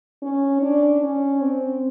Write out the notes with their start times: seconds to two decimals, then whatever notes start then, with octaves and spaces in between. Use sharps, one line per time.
0.22 C#4
0.62 D4
1.03 C#4
1.41 C4